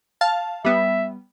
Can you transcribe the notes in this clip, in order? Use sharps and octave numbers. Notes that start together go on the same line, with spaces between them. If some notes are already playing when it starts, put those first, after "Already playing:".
F5 A5
G3 B3 E5